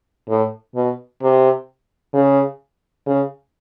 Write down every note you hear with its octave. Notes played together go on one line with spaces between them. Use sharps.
A2
B2
C3
C#3
C#3